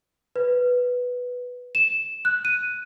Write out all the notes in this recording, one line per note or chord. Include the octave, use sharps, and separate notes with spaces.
B4
E7
F#6
D#7